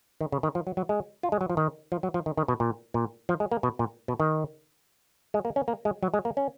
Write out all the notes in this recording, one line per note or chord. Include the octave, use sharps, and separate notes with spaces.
D#3
C#3
D#3
F3
F#3
F#3
G#3
F4
G#3
F#3
F3
D#3
F3
F#3
F3
D#3
D#3
B2
A#2
A#2
F3
G#3
A#3
B2
A#2
B2
D#3
G#3
A#3
C#4
A#3
G#3
F#3
G#3
A#3
C#4